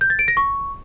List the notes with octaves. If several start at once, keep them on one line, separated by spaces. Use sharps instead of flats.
G6
A6
D7
A#6
C#6